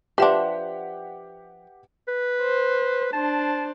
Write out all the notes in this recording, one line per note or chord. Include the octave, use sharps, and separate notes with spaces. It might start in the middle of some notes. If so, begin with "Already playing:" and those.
F3 D4 G4 B4 E5 F#5 C6
B4
C5
D4 C5 A5